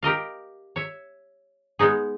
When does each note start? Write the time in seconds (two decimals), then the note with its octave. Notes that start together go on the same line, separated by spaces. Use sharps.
0.03 G4 A#4 D#5 F5
0.76 C#5 E5
1.79 G#3 B3 D#4 G#4